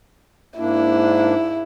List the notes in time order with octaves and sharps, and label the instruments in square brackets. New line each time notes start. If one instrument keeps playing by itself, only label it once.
[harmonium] G#2 A#3 D4 [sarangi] E4